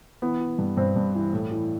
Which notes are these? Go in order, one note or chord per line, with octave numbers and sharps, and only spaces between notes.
E3 B3
E3
G2
G2 C4
G2
E3
A2
E3